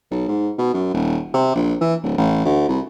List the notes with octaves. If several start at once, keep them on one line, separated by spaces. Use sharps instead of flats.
B1
G#2
B2
F#2
D#1
C3
A#1
E3
D1
A1
D2
C2